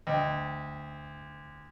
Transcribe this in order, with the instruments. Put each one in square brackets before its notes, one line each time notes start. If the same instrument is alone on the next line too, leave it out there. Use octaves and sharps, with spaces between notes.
[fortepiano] D2 [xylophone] D#5 G5